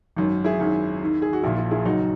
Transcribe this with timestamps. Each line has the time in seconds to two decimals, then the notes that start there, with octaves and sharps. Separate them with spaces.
0.16 G#1 F#2 D#3
0.44 E4 G#4
0.59 G#1 F#2 D#3
1.01 D#2 D#3
1.22 G#4
1.33 F#4
1.43 A#1 A#2 E4
1.58 E4
1.71 E4 G#4
1.85 F#1 F#2 D#3 D#4 F#4